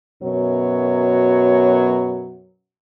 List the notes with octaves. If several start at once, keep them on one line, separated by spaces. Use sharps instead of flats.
F#2 B2 F#3 C#5